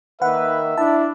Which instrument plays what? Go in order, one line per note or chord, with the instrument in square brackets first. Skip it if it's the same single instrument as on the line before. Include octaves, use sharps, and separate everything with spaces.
[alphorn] D#3 [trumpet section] A#3 B4 [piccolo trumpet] E5 [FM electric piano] F#5
[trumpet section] D4 [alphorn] E4 [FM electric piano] A5